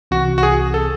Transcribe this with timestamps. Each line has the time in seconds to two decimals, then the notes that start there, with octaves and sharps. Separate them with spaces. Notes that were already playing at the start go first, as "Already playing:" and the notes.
0.11 C2 C3 E3 C4 F#4
0.38 F#4
0.43 G#4
0.74 A4